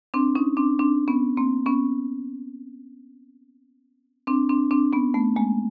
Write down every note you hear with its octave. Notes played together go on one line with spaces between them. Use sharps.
C4 D4
C#4 D#4
C4 D4
C4 D4
B3 C#4
A#3 C4
B3 C#4
C4 D4
C4 D4
C4 D4
B3 C#4
A3 B3
G#3 A#3